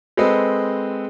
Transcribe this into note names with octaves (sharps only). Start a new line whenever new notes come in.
G#3 C4 A4 B4 D#5